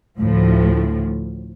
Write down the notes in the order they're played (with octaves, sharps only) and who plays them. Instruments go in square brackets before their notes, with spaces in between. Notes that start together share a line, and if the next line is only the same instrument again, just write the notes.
[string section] D2 A2 F3